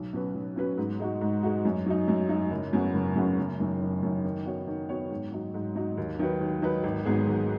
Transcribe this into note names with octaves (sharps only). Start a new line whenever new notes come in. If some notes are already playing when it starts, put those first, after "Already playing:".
Already playing: B1
B2 F#3 C#4 B4
B1
B2 F#3 C#4 B4
G#2
G#3 D#4 F#4
G#2
G#3 D#4 F#4
F#2
F#3 D#4
F#2
F#3 D#4
F#1
F#2 C#3 B3 F#4
F#1
F#2 C#3 B3 F#4
F#1
F#2 D#3
F#1
F#2 D#3
D#3
B3 F#4 C#5
D#3
B3 F#4 C#5
G#2
F#3 D#4
G#2
F#3 D#4
D#2
D#3 F#3 D#4 B4
D#2
D#3 F#3 D#4 B4
G#1
G#2 F#3 B3 G#4
G#1